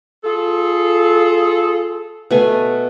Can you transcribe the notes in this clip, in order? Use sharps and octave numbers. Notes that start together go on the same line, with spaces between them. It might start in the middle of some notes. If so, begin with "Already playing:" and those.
F4 G#4 A4
B2 A3 G#5